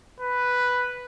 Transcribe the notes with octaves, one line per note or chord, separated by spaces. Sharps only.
B4